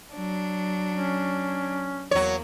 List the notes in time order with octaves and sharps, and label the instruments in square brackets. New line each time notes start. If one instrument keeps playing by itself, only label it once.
[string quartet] F#3 D4
[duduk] C#4
[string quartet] E2 A#3 [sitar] F#3 C#5